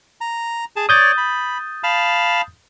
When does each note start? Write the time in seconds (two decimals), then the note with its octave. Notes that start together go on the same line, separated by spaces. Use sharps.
0.21 A#5
0.76 G#4 A5
0.89 C#5 D5 D#6 G6 A6
1.18 B5
1.84 F5 A5 B5